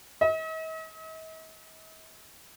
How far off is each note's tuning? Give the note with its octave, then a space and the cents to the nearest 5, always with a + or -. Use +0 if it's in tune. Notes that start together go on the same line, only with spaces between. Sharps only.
D#5 +45